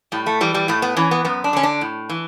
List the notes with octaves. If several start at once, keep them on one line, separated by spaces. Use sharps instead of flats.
A2 G3
A3
E3 G3
G3
A2 A3
B3
E3 C#4
B3
F#2 B3
D4
D3 C#4
D4
A2
E3